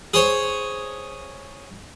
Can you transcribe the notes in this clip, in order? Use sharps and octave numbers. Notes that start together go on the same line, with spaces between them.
G#4 C5 C#5